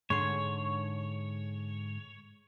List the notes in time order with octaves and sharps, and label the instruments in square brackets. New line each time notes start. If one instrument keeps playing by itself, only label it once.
[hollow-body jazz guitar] G#2 D3 C6 [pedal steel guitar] C#5